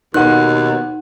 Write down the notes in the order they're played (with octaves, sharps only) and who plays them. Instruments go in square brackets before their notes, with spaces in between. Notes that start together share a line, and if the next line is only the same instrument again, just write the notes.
[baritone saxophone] D#2 [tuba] B2 [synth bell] D#4 F#5 [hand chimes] F#6